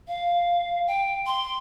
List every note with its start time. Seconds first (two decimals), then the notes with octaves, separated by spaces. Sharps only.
0.08 F5
0.87 G5
1.26 C6